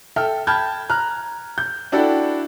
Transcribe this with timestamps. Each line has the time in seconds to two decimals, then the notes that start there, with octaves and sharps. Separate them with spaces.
0.16 A4 E5 G5 F6
0.47 G5 A5 B5 F6 G6 G#6
0.89 A#5 F6 F#6
1.58 G6
1.92 D4 E4 F#4 A4 D5 G5